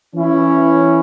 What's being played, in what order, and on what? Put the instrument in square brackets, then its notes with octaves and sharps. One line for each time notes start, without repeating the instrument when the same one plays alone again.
[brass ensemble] E3 C#4 E4